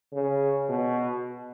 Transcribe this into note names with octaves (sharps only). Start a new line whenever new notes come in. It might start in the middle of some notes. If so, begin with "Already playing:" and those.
C#3
B2